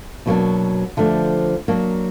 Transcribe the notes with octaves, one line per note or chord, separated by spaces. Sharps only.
B2 F#3 A#3 D4
D3 F3 A3 D4
F#3 A#3 D4